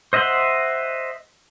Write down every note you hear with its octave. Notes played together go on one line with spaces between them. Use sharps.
C5 D#5 E5 F#5 C6